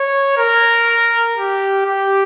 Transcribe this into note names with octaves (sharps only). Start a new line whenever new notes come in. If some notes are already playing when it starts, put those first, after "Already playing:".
Already playing: C#5
A#4
G4
G4